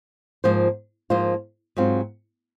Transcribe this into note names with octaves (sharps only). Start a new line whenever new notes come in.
G#2 F3 A#3 F4 C5
G#2 F3 A#3 F4 C5
G#2 F#3 C4 F4